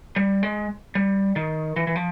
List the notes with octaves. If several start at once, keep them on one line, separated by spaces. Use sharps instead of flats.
G3
G#3
G3
D#3
E3
E3
F3